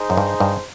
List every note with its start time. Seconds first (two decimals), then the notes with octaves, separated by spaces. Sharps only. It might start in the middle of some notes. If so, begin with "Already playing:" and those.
Already playing: D#4 G#4 C5
0.10 F#2
0.17 G2
0.40 G2